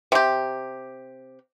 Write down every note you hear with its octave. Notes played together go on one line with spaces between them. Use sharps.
C3 G4